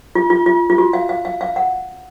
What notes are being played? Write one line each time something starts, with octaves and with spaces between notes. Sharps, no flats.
F4
F4
F4
F4
F#4
F5
F5
F5
F5
F#5